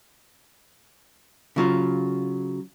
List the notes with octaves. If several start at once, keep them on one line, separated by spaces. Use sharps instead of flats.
C#3 F#3 F4